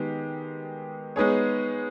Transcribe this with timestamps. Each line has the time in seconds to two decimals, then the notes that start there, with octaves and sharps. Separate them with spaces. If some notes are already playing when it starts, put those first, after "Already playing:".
Already playing: D#3 G#3 B3 G4
1.16 G#3 B3 D#4 G#4 C#5